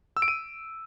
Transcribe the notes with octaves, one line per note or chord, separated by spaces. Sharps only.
E6
D7
D#7